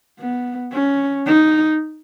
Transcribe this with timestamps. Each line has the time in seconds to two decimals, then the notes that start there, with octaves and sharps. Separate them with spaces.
0.20 B3
0.73 C#4
1.26 D#4